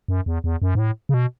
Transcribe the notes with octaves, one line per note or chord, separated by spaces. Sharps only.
F#2
E2
E2
F#2
G#2
A2
C#3
B2